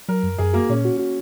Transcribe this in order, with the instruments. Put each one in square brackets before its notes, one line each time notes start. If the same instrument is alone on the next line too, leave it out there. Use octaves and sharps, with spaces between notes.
[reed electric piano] F#3 [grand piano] A#4
[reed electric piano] F#2
[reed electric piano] F#2 [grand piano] G#4
[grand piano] A#3 [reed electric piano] F#4
[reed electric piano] A#2 [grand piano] C#4
[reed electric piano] F#4
F#4